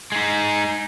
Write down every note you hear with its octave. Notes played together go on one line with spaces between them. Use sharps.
G#3 D#4